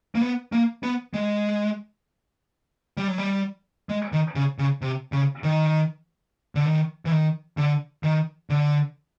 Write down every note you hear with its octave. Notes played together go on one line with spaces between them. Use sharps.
A#3
B3
A#3
B3
G#3
G3
F#3
G3
G#3
D#3
C#3
C#3
C3
C#3
D#3
D3
D#3
E3
D#3
D3
D#3
D3